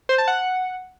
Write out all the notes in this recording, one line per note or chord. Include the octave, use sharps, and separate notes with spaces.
C5
A5
F#5